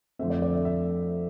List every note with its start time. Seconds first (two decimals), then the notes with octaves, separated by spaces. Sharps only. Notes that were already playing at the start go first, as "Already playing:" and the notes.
0.19 F2 D3 A3 C4 E5
0.30 D5
0.42 D5
0.53 E5
0.65 E5